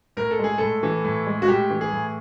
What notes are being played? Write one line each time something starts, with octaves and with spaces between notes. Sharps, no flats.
A2 A#4
A4
G#3 G#4
A2 A4
E3
A2
G#3
F#4
A2 G4
E3
G#4
A2